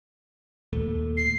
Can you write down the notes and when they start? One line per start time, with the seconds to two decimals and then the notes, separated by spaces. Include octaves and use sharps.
0.73 D#2 A#2 A3
1.17 C7